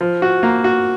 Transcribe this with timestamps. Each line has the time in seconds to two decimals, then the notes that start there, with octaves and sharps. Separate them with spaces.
0.01 F3
0.22 F#4
0.43 A#3
0.64 F#4